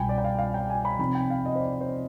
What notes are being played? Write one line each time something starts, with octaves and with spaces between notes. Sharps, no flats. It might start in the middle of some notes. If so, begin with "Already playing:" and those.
Already playing: C2 B2 G3 G5 G#5 B5
D5
G5
F5
F5
G5
G#5
B5
C3 F3 C4 D#4 B5
G5
F5
D#5
C5
D5
C5